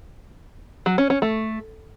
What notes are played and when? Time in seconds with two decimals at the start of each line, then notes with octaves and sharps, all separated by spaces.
0.86 F#3
0.98 C#4
1.10 C#4
1.22 A3